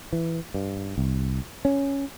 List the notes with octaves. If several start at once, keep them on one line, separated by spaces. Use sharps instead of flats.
E3
G2
C2
C#4